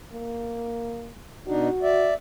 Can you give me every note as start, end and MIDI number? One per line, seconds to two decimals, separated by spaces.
0.13 1.12 58
1.47 1.69 47
1.47 1.69 62
1.47 1.69 63
1.47 2.11 66
1.82 2.14 74
1.82 2.14 76